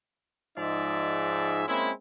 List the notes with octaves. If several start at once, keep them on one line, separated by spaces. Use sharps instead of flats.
G#2 F3 G#3 D#4 D5 E5
G#3 A#3 C4 C#4 E4